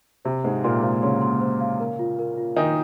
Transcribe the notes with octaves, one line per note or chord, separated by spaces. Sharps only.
C3 C5
G#2 G#3 C5
A#2 A#3 C6
C3 C4 F5
C#3 C#4 C6
C6
C5
F5
A#4
F4
A#4
F4
D#3 D#4 G#5